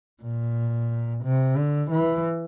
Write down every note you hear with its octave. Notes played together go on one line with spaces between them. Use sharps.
A#2
C3
D3
E3